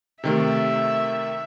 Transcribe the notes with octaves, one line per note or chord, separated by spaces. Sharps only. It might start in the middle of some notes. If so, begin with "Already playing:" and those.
C3 D#3 A3 E5